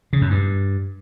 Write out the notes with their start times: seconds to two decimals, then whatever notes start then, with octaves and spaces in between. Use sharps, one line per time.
0.13 C#3
0.21 F#2
0.30 G2